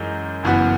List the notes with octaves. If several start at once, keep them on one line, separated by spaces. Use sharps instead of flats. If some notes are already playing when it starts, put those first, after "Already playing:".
Already playing: F#2 E3 G#3 D#4
F#1 F#2 E3 B3 F#4